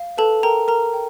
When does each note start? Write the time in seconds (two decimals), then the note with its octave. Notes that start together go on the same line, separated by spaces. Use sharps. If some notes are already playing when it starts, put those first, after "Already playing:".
Already playing: F5
0.17 A4 B4 A5
0.43 A#4 G5 A#5
0.68 A#4 A#5
0.94 G5